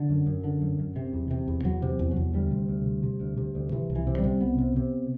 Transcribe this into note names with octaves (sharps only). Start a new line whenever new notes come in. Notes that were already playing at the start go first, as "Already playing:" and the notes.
Already playing: D3
F#2
F#2
D3
F#2
F#2
C3
E2
C3
E2
E2 F#3
C3
E2
F#3
E2
D2 G3
C3
D2
C3
C3
D2
C3
D2
C3 E3
C2
E3
C3
G3
C3
C2 B3
C3
C3